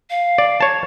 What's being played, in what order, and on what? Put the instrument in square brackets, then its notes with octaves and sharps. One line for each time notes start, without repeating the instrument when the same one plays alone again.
[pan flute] F5
[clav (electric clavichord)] D5
C#5 A5